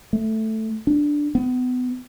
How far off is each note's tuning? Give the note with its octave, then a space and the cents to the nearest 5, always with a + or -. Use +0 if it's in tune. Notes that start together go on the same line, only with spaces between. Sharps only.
A3 +0
D4 +0
B3 +30